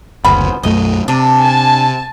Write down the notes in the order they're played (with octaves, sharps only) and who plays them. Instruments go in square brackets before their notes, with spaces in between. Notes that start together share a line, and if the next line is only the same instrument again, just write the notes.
[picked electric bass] F#1 D2 [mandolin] B3 C#4 C5 [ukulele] B5
[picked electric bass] B1 F#2 A3 [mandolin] D#5
[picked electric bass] C3 [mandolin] D4
[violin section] G#5 A5